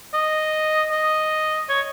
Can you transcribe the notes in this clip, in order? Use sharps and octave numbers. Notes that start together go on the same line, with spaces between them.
D#5
D#5
C#5